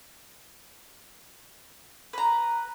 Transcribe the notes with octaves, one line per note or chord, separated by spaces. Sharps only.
B4 A#5